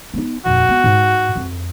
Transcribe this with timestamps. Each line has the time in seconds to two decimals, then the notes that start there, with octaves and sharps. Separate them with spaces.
0.14 B3 D#4
0.46 D#1 F2 F#4
0.69 B3
0.84 G#2
1.36 F2